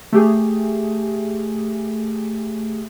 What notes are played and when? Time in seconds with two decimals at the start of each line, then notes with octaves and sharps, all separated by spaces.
0.13 A3 G4 G#4